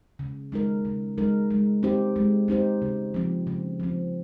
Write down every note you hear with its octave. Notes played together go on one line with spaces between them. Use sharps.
C#3
G#3 D#4 A#4
C#3
G#3 D#4 A#4
G#3
C4 D#4 G4 C5
G#3
C4 D#4 G4 C5
C#3
F3 C4
C#3
F3 C4